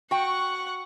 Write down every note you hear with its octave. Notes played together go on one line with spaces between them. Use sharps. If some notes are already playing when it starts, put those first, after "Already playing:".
F#4 F#5 G5 C#6